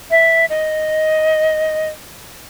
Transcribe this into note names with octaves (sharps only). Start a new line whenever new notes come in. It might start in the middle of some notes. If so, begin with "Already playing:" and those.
E5
D#5